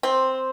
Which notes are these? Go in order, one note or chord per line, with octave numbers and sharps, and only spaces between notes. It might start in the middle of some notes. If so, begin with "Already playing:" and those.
C4